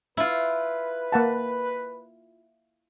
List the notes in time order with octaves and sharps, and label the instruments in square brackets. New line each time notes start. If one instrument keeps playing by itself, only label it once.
[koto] E4 F4 [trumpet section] B4
[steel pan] A#3 F#5 A5